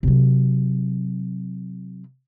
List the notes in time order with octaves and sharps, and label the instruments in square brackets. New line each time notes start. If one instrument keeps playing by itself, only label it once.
[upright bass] C3 F#3